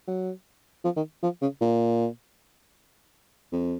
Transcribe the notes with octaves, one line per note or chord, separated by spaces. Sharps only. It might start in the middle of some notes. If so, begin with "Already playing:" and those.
F#3
F3
D#3
F3
C#3
A#2
F2